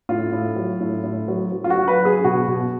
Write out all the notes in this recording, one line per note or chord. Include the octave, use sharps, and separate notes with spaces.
A2 F4
A2
F#3
A2
A2
F#3
F#3
F4
F#4
F#3
B4
F#3 G#4
B2 F#4
B2